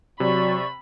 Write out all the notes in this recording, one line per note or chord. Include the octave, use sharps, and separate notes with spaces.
C3 F#3 D5 B5 C#6